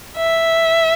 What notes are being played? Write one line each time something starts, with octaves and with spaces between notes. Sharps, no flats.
E5